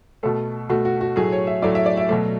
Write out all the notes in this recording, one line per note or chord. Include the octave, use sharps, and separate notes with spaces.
B2 A3 A4
B2 A3 F#4
F#4
F#4
A2 F#3 A3 G#4
C#5
E5
A2 F#3 A3 D5
E5
D5
E5
B2 F#3 A3